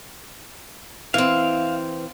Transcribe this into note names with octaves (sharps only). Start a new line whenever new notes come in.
E3 C4 F5